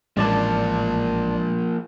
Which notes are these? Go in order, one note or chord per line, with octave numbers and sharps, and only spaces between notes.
A1 F3 G#3 A#3 D5 A5